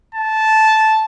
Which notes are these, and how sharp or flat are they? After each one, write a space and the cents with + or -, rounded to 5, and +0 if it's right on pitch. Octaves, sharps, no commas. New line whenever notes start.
A5 -10